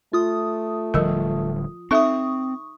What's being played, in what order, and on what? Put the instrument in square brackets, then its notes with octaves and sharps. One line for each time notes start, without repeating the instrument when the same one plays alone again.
[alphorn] A3 [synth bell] F4 D#6
[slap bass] D1 D3 G3 [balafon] F3 A#4
[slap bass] C4 [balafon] D#4 A4 E5 [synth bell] C#6 D#6